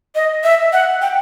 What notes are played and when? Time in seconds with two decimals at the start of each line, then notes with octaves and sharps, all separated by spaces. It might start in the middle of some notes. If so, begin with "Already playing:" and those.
0.15 D#5
0.44 E5
0.73 F#5
1.01 G5